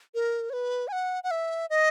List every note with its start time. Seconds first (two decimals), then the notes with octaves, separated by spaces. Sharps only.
0.15 A#4
0.50 C#5
0.53 B4
0.88 G#5
0.92 F#5
1.24 F#5
1.31 E5
1.70 D#5